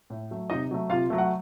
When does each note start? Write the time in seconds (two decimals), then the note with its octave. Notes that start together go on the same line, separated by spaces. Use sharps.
0.10 A2
0.31 F#3 A3
0.50 C3 D#4 D#5
0.71 F#3 A3
0.90 C3 F4 F5
1.10 F#3 A3
1.18 F#5